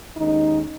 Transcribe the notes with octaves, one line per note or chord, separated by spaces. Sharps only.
D#2 D#3 G#3 C#4 D#4